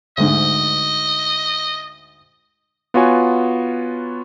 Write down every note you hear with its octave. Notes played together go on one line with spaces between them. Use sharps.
D2 G#2 D#5
B3 F4 F#4 C#5 G#5